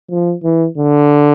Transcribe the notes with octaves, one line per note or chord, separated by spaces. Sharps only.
F3
E3
D3